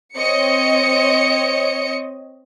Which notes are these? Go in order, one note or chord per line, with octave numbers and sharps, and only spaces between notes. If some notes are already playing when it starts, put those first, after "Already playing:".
C4 C#5 D#5 C#7